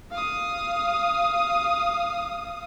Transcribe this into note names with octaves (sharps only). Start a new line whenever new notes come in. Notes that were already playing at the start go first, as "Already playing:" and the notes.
F5 D#6